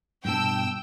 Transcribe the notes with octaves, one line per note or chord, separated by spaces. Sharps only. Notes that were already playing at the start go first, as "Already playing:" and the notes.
G2 B2 G5 A5 E6